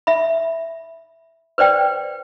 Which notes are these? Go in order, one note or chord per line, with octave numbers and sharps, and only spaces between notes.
E5 B5
B4 C5 D5 G5